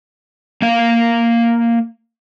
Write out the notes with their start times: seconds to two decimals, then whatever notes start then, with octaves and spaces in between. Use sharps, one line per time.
0.62 A#3 F5